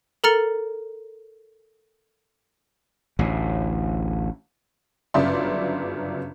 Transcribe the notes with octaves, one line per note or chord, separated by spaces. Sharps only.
A4 A#4 A#5 F6 A6 C#7
A1 D2 A2
G1 F#2 C#3 D5 E5 C6